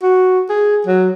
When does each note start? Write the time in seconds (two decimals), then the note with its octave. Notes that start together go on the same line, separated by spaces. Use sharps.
0.03 F#4
0.49 G#4
0.86 F#3